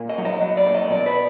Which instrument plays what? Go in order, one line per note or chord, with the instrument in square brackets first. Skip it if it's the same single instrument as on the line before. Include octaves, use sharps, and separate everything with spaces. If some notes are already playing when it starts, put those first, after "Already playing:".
Already playing: [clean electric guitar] A#2
D#5
F#3
D#5
F#3 D#5
D5
A#2
D#5
B2 D5
B4